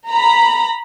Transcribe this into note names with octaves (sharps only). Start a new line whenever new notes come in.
A#5 B5